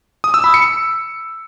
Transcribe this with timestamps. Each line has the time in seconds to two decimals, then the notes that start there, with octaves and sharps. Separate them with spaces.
0.24 D#6
0.34 E6
0.44 B5
0.54 C#7